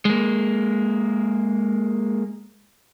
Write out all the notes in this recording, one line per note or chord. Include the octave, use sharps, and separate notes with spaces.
G#3 A#3